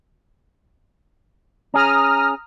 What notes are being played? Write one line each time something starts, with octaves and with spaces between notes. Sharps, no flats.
C#4 G#4 A#5 D#6 F6